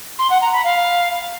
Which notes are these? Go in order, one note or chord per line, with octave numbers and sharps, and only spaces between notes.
C6
F#5
A#5
B5
F5